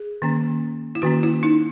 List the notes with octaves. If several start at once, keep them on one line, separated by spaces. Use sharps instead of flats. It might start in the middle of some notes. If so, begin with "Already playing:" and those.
Already playing: G#4
D#3 A#3 C#4
E4
D#3 A#3 C#4 F#4
E4
D#4